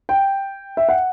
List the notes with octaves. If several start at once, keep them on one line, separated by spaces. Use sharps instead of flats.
G5
E5
F#5